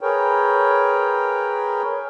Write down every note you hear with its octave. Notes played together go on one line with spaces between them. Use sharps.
G#4 A#4 B4 C#5 G5